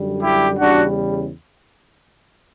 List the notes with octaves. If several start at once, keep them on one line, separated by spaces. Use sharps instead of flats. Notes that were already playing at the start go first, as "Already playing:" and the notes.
Already playing: F#2 D3 G3
E4 G4
E2 C#3 G3 D4 F#4